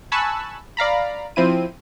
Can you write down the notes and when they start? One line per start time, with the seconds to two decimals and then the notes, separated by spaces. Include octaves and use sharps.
0.12 G#5 A5 B5 C#6 E6 F#6
0.77 D5 F5 A#5 B5
1.36 F3 C4 E4 D#7